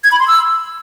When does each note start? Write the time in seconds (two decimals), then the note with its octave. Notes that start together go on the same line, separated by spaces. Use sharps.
0.04 G#6
0.12 B5
0.20 C6
0.27 E6